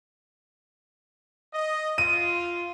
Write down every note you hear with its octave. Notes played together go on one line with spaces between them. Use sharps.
D#5
F4 D#7